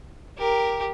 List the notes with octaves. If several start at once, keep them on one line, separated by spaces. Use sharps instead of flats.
G4 A#4